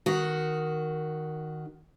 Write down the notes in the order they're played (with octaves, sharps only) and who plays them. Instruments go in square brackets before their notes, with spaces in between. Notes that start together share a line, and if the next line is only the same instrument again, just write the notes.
[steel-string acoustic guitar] D#3 F#4